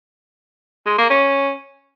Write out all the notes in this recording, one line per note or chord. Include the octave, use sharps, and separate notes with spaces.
G#3
A#3
C#4